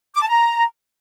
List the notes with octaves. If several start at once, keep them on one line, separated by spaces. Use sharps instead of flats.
D6
A5
A#5